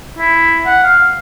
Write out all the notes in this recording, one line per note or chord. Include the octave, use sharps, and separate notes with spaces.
E4
F#5
F5